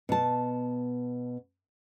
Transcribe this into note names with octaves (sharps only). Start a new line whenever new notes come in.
B2 A5